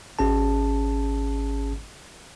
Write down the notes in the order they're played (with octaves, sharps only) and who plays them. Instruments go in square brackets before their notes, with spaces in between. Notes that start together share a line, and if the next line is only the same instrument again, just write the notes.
[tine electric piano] G#1 C#4 G#4 A5